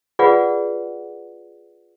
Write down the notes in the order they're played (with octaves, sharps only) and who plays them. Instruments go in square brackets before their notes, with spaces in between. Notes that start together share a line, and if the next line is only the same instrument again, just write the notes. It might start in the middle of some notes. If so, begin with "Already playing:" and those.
[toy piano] F4 G#4 B4 D5 F#5